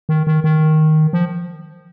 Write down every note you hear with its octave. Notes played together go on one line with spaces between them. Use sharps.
D#3
D#3
D#3
F3